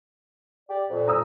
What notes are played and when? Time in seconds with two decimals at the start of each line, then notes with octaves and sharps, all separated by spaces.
0.69 G4 D5
0.88 F2 A#2
1.08 A#5 D#6 E6